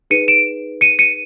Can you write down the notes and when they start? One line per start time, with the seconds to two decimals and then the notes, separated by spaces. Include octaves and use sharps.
0.10 D#4 G#4 B4 C#7 D#7
0.28 D7 E7
0.81 C#7 D#7
0.99 C#7 D#7